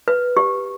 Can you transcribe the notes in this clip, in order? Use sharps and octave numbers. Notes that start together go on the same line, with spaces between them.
B4
G4